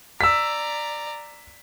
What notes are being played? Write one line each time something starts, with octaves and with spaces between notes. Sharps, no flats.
D5 A#5 E6 B6